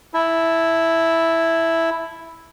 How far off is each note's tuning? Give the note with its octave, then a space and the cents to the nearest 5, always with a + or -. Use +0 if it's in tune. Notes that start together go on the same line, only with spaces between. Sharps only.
E4 +0 A5 +0